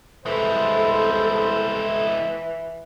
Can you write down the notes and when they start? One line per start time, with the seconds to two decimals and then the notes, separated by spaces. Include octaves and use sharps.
0.26 C2 E3 G#3 E4 A4 C5